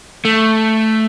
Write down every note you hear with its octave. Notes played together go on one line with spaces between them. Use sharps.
A3